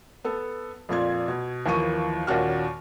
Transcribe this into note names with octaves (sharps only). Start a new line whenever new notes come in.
B3 A4
F2 A#2 F4 D5 C6 G#6
B2
D#2 E3 F3 A#4 C#6 D#7
D#2 A#2 C#4 F#4 F6